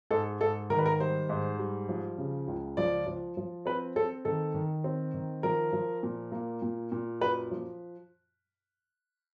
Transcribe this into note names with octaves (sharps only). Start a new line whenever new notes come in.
G#2 A4
G#2 A4
D#3 A#4
B4
A#4
G3 C5
G#2
G3
F3
C#3
C#2
F3 D5
F3
F3
C4 B4
C4 A4
D#3 A4
D#3
C4
D#3
F3 A#4
F3
A#2
A#3
A#2
A#2
F#2 B4
F3